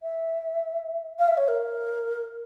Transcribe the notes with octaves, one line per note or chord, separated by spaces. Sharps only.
E5
F5
E5
C#5
A#4